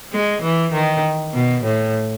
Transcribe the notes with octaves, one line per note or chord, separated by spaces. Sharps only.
G#3
E3
D#3
B2
A2